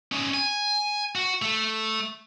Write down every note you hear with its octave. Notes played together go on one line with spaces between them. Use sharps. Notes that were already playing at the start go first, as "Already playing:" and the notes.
C#4 D#4
G#5
F#4
A3